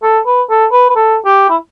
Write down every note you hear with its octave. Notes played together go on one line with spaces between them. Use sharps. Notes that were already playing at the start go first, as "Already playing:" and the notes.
A4
B4
A4
B4
B4
A4
G4
E4